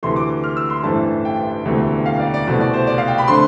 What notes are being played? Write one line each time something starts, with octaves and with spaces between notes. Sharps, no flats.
D2 C3 E3 A3 C6
D6
F6
E6
C6
A1 G2 E3 A3 C4 A5
G5
E1 D2 C3 E3 A3
F5
D5
D5
C2 B2 A3 C4
D5
C5
D5
F5
G5
B5
D3 A3 C4 C6